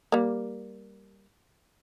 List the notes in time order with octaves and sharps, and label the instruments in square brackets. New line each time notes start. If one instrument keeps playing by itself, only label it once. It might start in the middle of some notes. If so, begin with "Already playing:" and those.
[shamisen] G3 A#3